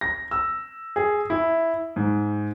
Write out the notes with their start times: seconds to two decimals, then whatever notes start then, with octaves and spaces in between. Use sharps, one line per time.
0.01 A#6
0.31 E6
0.96 G#4
1.30 E4
1.96 G#2